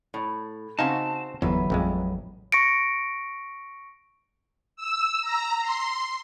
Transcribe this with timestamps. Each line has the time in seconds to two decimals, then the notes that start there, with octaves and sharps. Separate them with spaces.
0.14 A2
0.79 C#3 C4 D#4 F#4 F5 G#5 A5
1.42 G1 E2 F#3 B4 E5
1.70 A1 F2 G#3
2.52 C#6 A#6 C#7 D7
4.76 E6
5.22 A#5
5.61 C6